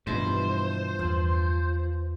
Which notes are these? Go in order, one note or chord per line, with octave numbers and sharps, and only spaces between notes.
G2 B2 E3 F3 C5
E2 F3